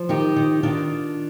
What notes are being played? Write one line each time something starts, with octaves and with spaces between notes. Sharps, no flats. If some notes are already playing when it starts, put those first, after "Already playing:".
Already playing: F3
D#3 D#4 G4
D#3
D#3 D4 F4